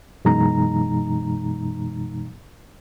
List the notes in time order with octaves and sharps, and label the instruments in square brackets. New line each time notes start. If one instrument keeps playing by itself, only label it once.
[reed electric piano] F#2 B2 E3 G#3 D#4 A#5